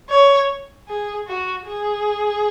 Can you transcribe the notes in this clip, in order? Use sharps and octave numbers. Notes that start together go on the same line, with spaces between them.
C#5
G#4
F#4
G#4